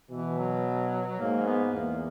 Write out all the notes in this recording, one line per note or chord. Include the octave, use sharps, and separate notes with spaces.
B2 E3
F#3
G#2 A#3
B3
E2 A#3